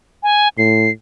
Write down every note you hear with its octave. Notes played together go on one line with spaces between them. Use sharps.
G#5
A2 C7